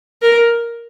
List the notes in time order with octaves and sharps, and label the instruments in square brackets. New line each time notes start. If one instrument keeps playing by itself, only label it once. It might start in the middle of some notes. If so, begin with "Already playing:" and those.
[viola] A#4